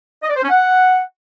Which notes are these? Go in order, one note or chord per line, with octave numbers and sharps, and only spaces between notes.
D#5
D5
C5
C#4
F#5